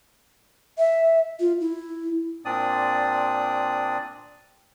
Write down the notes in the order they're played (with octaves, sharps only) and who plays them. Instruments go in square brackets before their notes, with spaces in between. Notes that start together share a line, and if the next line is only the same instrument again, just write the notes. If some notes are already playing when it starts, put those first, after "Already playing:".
[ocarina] E5
F4
E4
[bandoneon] A#2 C4 D4 D5 D#6